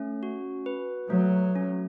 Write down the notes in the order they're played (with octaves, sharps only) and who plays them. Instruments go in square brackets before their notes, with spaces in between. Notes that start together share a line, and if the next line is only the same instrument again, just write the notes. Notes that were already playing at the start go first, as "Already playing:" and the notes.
Already playing: [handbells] A3 C#4
F#4
B4
[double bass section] F#3 [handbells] A3
[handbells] C#4